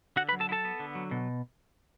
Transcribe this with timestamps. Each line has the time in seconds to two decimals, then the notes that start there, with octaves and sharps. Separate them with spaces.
0.16 D3 F#4 F#5
0.29 B4 B5
0.33 F#3
0.40 A4 A5
0.49 E4
0.52 A4 A5
0.65 B3
0.80 D3
0.95 F#3
1.11 B2